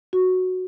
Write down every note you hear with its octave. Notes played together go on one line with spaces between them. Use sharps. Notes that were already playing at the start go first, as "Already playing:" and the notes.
F#4